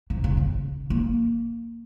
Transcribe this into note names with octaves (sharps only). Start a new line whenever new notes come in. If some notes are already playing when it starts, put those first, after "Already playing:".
C3
C#3
C#3
A#3